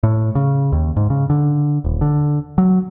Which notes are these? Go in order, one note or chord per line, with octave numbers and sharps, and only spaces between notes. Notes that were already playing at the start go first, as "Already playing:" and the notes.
A2
C#3
D#2
G#2
C#3
D3
D#1
D3
F#3